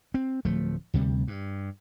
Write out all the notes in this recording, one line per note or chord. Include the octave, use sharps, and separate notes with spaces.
C4
D1 F3 A3
D2 C3 G3
G2